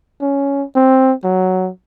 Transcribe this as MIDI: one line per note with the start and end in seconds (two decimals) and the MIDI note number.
0.21 0.64 61
0.76 1.13 60
1.24 1.70 54